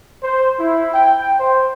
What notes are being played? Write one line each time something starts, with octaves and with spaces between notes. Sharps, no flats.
C5
E4
G5
C5